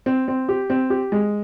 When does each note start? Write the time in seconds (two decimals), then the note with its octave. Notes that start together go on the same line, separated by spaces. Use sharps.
0.06 C4
0.28 C4
0.49 G4
0.70 C4
0.90 G4
1.12 G#3